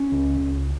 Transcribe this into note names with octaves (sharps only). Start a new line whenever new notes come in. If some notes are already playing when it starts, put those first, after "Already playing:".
Already playing: C#4
C#2
C#2